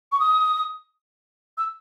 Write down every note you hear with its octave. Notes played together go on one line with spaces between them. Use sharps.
C#6
D#6
E6